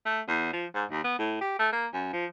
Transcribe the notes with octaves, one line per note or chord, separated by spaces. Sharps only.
A3
E2
F3
G#2
D#2
B3
A2
G4
A3
A#3
F#2
F3